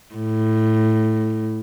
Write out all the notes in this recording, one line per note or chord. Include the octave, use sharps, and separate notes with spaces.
A2